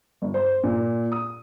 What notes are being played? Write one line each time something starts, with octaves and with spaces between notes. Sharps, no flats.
G1
C5
A#2
D#6